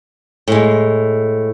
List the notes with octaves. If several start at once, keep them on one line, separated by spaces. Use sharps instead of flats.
A2 G#3